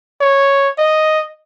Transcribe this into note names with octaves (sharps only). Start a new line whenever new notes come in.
C#5
D#5